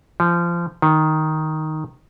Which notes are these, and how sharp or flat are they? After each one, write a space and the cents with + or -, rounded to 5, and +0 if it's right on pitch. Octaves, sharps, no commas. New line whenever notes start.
F3 -25
D#3 +5